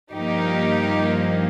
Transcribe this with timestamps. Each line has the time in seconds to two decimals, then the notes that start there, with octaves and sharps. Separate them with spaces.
0.13 G2 F3 A#3 D#4 G4